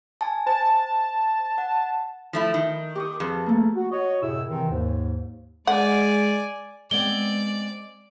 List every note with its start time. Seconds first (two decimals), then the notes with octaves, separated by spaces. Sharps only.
0.21 G#5 A5
0.47 C5 A5
1.58 F#5
2.33 F3 A3 E4
2.54 D#3
2.95 G4 C#6 D#6
3.20 F2 G#4 B4 A5
3.46 A3 A#3
3.75 F#4
3.91 F#4 C#5 D#5
4.22 F#2 A2 C3 E4 G#4 E6
4.49 C3 D#3 E3 C4
4.69 D#2 G#2
5.67 G#3 D5 F#5 G#5
6.91 G#3 B3 C4 D5 G7